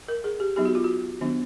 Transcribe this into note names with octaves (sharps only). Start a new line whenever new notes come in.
A#4
G#4
G4
F#3 B3 D#4 G4
F#4
F4
F#4
D#3 F#3 B3 D4